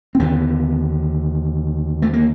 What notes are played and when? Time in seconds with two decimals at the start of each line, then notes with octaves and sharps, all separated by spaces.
0.15 C4
0.20 D#2 D3 B3
2.02 A3
2.13 A#3